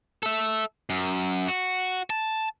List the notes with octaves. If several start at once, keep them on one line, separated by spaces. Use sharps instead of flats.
A4 E5
F#2
F#4
A5